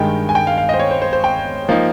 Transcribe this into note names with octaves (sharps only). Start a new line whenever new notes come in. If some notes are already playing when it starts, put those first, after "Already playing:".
Already playing: G2 D#3 G#3 G5
G#5
G5
F5
F5
C5 D#5
C#5
C5
C5
C5
G5
F3 A#3 D#4